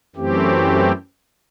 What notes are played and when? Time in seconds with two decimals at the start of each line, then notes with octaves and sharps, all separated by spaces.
0.16 F#2 E3 A3 C4 G4